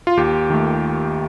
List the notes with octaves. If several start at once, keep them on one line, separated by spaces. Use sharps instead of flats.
F4
D#2 G4
D#3 A3